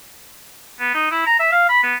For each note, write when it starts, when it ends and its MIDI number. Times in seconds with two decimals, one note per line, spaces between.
0.80 0.90 59
0.94 1.07 63
1.11 1.22 64
1.27 1.35 82
1.40 1.48 76
1.52 1.69 77
1.69 1.82 83
1.83 1.95 59